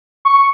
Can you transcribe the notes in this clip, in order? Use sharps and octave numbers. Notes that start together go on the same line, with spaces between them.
C#6